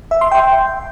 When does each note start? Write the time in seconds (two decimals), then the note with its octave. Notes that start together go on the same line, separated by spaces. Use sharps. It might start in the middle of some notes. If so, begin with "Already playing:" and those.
0.11 E5
0.21 C6
0.32 G5